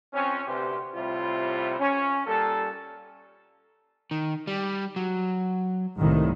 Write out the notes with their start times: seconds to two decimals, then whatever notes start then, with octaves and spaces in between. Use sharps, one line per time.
0.13 F2 C4 C#4
0.47 D2 C3 G4 B4 C5
0.94 A2 C3 G3 F4 C5
1.79 C#4
2.26 A#2 G3 A#3 A4
4.11 D#3
4.47 G3
4.96 F#3
5.97 C2 A2 D#3